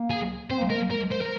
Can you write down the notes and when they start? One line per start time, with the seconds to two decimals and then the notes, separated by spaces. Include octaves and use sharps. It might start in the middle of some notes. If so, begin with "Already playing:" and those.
Already playing: A#3
0.10 G#4
0.50 C4 C5
0.58 A#3
0.67 G#3
0.70 A#4
0.75 A#3
0.90 G#3 A#4
1.11 C5
1.21 A#4